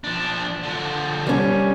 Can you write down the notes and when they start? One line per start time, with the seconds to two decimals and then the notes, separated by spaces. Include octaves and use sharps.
0.04 F3 D4
0.63 D3 F3
1.27 G3 C#4